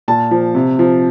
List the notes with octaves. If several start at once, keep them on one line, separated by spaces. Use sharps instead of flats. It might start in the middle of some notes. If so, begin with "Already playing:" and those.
A#2 A5
F3
C3
F3